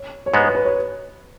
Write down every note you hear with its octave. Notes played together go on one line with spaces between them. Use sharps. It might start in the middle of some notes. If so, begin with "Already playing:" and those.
Already playing: C#5
C#5
G#2 G#3 B3 B4
B4
B4
C#5